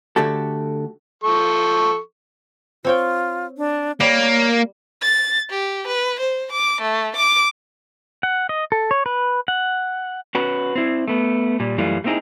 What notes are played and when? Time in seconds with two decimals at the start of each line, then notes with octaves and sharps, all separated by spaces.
0.16 D3 A3 F#4 G4 A4
1.24 F3 A4 C#6
2.84 C4 F4 C#5 G5
3.57 D4
4.00 G3 A#3 C#5
5.02 A6
5.50 G4
5.87 B4
6.20 C5
6.52 D6
6.82 A3
7.16 D6
8.23 F#5
8.49 D#5
8.72 A4
8.91 C#5
9.06 B4
9.48 F#5
10.35 C#4 F#4 B4
10.75 C4 E4
11.08 A3 B3
11.60 A#2 G3
11.78 F#2 E3 G3 A3 F4
12.04 A3 A#3 C4 D#4 E4 G#4